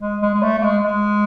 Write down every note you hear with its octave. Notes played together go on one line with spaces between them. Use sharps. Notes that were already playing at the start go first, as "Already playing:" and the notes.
G#3
G#3
G#3
A3
A3
G#3
G#3